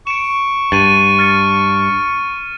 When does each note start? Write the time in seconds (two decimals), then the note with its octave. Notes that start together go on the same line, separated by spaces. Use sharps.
0.07 C#6 D7 E7
0.72 G2 A6 D#7
1.19 F6 A6 C#7